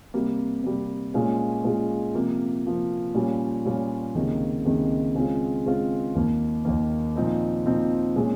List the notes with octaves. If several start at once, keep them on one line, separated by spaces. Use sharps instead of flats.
C3 G3 A#3
C3 G3 A#3
A#2 G#3 C#4 F4
A#2 G#3 C#4 F4
C3 F3 A#3
C3 F3 A#3
A#2 G3 C#4 F4
A#2 G3 C#4 F4
C#2 C3 D#3 A#3
C#2 C3 D#3 A#3
C#3 G#3 C4 F4
C#3 G#3 C4 F4
D#2 D#3 A#3
D#2 D#3 A#3
A#2 F3 C4 D#4
A#2 F3 C4 D#4
A#2 G#3 C#4